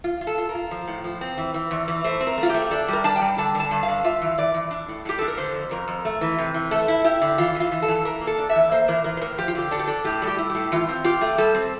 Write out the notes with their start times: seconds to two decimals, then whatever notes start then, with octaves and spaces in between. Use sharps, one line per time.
0.04 F4
0.21 F4
0.27 A4
0.38 F4
0.49 A#4
0.55 F4
0.71 F3
0.88 A2
1.04 F3
1.21 C4
1.37 E3
1.54 E3
1.71 E2
1.88 E3
2.04 A3 C5
2.21 C4
2.27 A#4
2.38 A3 F4
2.49 G4
2.54 A3
2.71 D4 A4
2.88 G3 A#4
3.04 D4 A5
3.16 G5
3.22 G3
3.38 D3 A5
3.54 D3
3.60 A5
3.71 G2
3.83 F5
3.88 D3
4.04 F4 E5
4.22 E3
4.38 E3 D5
4.54 E3
4.71 D4
4.88 A2
5.05 A2 G4
5.19 D4 A4
5.28 A#4
5.37 D3 C5
5.54 F2
5.71 F2 A#4
5.88 F2
6.05 A3
6.21 E3
6.38 C3
6.54 E3
6.71 A3 A4
6.88 E4
7.04 E4 G4
7.22 D3
7.38 E3 F4
7.55 E3
7.60 F4
7.72 E3
7.82 A4
7.88 E3
8.05 E3 A#4
8.21 A#3
8.27 A4
8.38 D4
8.49 E5
8.55 E3
8.71 A#3 C5
8.88 E3 A#4
9.04 E3 A#4
9.17 C5
9.21 A2 A#4
9.38 F3 G4
9.48 F4
9.55 D3 G4
9.71 D4 A4
9.79 G4
9.87 D4 A4
10.04 A2 G4
10.22 G3 A4
10.27 G4
10.38 E4
10.50 G4
10.55 A2
10.72 E3 F4
10.88 C4
11.04 F4 G4
11.21 A3
11.38 G3 A4
11.55 C4